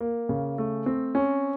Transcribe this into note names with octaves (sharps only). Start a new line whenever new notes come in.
A#3
C#3
A3
C4
C#4